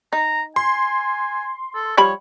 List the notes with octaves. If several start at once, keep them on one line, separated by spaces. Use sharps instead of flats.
D#4 A#5
G#5 C6
A4
F3 G3 C#5 B5